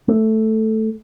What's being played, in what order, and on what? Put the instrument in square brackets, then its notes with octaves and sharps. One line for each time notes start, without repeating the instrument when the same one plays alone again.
[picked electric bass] A3